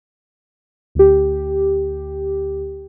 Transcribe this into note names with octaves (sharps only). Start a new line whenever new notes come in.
D2 G4